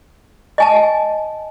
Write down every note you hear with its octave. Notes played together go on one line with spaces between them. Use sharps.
D#5 G#5 A5